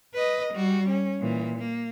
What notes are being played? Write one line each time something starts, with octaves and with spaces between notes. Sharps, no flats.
B4 D#5
G3 F#4
C#4
A#2 E3
A#3